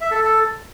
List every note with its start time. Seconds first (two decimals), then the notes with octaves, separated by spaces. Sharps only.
0.01 E5
0.11 A4
0.21 A4